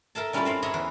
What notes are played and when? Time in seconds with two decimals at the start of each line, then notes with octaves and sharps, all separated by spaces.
0.15 A4 A#4 E5 A5
0.33 G3 C#4 E4 F4 G4 A4
0.45 C4 E4 F5
0.62 E4 G#4 C#5 D#5 E5 A#5
0.74 E2 B4